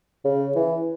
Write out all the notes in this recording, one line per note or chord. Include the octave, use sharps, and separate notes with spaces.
C#3
E3